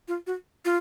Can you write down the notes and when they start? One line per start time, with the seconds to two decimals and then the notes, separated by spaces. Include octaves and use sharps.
0.08 F4
0.27 F#4
0.65 F4